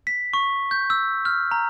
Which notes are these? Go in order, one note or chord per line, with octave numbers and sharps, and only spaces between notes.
B6
C#6
G6
E6
F6
A#5